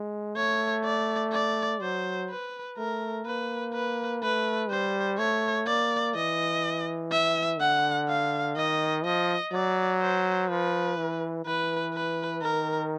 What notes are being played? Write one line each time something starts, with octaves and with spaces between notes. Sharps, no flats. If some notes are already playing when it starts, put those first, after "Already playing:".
Already playing: G#3
A3 C#5
D5
D5
F#3 C5
B4
A3 A#4
A#3 B4
B4
A3 B4
G3 C5
A3 C#5
A#3 D5
E3 D#5
E5
D3 F#5
F5
D#3 D#5
F3 D#5
F#3 D5
C5
F3 B4
E3
E3 B4
B4
D#3 A#4